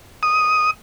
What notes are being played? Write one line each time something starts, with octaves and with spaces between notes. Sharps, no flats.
D#6